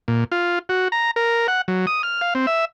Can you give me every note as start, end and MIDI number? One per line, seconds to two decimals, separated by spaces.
0.08 0.24 46
0.32 0.59 65
0.69 0.88 66
0.92 1.11 82
1.16 1.47 70
1.48 1.61 78
1.68 1.86 54
1.87 2.02 87
2.03 2.21 89
2.21 2.34 77
2.35 2.46 60
2.47 2.65 76